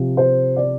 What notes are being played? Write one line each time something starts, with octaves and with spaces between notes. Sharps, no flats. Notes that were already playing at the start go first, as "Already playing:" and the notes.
Already playing: C3 F3
C5
D5